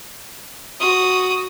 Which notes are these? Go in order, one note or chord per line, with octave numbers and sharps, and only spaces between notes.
F#4 D#6